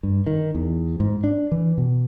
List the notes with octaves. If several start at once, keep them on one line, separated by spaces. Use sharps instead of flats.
G2
D#3
E2
G#2
D4
E3
B2